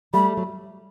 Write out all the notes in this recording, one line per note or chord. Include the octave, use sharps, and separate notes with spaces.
G3 A3 B5
F#3